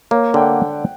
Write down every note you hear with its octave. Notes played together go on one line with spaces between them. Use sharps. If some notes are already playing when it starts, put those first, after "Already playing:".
A#3 C#5
D3 G5
F#5